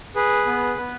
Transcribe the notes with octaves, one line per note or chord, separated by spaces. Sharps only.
G#4 B4
B3
B3